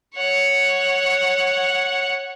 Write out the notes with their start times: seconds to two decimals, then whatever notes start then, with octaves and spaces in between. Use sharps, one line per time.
0.15 C#5 F#5